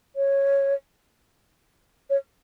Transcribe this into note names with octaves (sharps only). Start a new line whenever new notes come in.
C#5
C#5